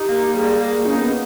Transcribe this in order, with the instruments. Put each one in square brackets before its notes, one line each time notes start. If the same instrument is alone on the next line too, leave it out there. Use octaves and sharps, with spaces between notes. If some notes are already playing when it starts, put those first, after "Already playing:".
Already playing: [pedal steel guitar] D#4 [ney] G4
[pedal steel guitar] A#3
[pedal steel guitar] G3 [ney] G#4
[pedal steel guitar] A#3 [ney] G#4
[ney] C#4 [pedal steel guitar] D#4
[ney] B3